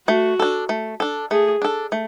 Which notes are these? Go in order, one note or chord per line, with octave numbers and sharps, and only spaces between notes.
A3 F#4
D4 A4
A3
D4 A4
A3 G#4
D4 A4
A3